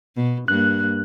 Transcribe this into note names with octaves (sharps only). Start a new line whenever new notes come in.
B2
G2 A#3 F#6